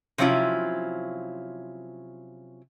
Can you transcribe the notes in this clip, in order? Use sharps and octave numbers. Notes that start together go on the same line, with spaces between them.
C3 F3 F#3 C#4 E4 F4